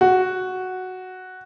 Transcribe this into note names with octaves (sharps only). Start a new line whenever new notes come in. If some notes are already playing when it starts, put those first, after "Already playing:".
F#4